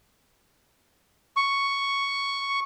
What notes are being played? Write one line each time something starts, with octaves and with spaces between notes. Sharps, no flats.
C#6